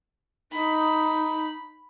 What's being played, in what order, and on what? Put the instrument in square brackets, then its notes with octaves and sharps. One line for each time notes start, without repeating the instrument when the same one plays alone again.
[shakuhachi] D#4 [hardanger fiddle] B5